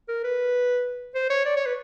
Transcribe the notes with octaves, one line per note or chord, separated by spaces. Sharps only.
A#4
B4
C5
C#5
D5
C#5
B4